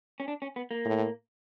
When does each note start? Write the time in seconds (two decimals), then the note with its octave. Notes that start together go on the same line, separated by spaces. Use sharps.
0.20 C#4
0.28 D4
0.42 C#4
0.56 B3
0.71 A#3
0.85 A2